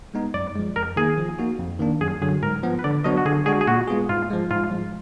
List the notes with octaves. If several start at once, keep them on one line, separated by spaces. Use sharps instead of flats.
G#3 B3 D#4
F#2 D5
F3 G#3
F2 A#4
D#3 A#3 D#4 G#4
F3
A#3 D#4 F#4
F2
D#3 A#3 D4
F#2 G#4
D3 F#3 G#4
G#2 A#4
F3 B3
B4
D3 D5
F#3 B3 D4 F#4 D#5
F#4
D3 G#4
G#3 D4 F#4 G#4
G#4
A#2 F#4
G#3 B3 F4 G#4
G#2 F4
F3 G#3
G#2 F4
F3 G#3